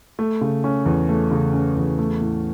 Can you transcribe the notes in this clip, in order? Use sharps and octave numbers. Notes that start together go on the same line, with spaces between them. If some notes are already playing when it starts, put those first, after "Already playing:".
A3
C#3
C#4
E2
A3
C#3
C#4
E2
A3
A2